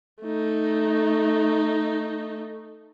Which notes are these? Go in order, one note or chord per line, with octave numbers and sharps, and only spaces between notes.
A3 D#4